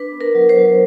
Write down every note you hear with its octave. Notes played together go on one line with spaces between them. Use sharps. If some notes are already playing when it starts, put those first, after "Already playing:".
Already playing: D4 B4
B3
A#4
F#3
C5
F#3